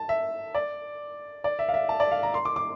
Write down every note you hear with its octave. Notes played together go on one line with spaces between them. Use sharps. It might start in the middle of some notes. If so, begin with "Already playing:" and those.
Already playing: A5
E5
D5
D5
E5
F5
E5
A5
D5
F5
A#5
C6
D6
D6